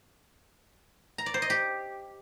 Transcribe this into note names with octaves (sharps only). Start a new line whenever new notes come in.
A#5
D5
C5
D#5
G4